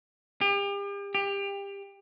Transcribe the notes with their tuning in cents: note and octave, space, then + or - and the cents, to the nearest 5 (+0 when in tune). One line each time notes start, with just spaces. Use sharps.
G4 +40
G4 +25